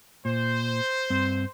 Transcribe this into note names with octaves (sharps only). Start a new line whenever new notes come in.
A#2 C5
G2 C4